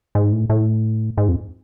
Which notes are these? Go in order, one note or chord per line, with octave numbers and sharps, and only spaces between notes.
G#2
A2
A2
G#2
F2